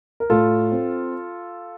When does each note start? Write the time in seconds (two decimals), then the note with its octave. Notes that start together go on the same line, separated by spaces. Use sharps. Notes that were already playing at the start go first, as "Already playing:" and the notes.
0.20 A#4
0.30 A2 F4 A4
0.72 C4